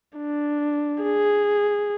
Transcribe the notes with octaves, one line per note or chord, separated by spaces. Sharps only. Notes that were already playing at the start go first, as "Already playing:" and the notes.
D4
G#4